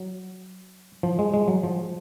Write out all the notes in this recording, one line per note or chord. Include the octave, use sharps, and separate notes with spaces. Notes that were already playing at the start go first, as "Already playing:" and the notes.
Already playing: F#3
F3
G#3
G#3
F#3
F3